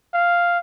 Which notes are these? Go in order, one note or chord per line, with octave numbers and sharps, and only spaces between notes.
F5